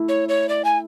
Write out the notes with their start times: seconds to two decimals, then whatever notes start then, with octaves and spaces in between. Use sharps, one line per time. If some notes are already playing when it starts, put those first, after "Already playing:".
Already playing: A3 E4
0.09 C#5
0.29 C#5
0.49 D5
0.65 G#5